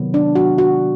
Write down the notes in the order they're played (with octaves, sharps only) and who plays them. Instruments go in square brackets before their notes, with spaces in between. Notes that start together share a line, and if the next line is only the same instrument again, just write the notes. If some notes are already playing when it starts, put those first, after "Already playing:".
Already playing: [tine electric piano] C3 D#3 F#3 B3
[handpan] D4
F#4
F#4